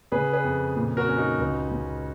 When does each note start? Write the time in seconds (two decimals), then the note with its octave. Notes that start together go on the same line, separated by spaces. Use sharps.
0.12 C#3 G#4 B4
0.33 G#4 B4
0.44 F2
0.76 A#2
0.97 F#4 A#4
1.07 C#4
1.18 D#4 F#4
1.39 C#2
1.71 C#3